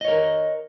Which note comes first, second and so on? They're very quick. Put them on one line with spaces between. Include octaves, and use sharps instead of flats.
D#5 C#5 A#4